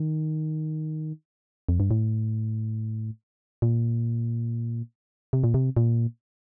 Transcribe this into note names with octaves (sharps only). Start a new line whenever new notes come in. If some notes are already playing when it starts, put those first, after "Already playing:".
Already playing: D#3
F2
G2
A2
A#2
C3
A#2
C3
A#2